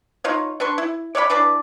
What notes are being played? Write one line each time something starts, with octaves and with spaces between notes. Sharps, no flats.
D#4 F4 C#5
D4 B4 C6 C#6
E4
C#5 D5 F5 B5
E3 D4 B4 D5